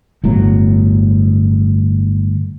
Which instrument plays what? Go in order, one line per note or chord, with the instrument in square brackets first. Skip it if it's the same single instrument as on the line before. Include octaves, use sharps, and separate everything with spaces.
[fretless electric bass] G1 A2 F#3